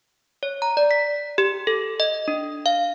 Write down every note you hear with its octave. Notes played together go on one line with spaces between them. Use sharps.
C#5
A#5
D5
B6
G4
A4
D#5
D4
F5